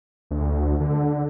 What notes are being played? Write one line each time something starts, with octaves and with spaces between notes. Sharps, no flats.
D2
D3